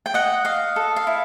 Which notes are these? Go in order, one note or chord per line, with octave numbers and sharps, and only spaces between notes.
G5
D#5 F#5
D#5 F5
A4
F5
E4